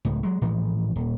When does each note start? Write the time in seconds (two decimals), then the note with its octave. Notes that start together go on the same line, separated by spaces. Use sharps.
0.05 C#2 A2
0.23 F#3 G#3
0.42 A2 E3 F3 G#3
0.96 D#1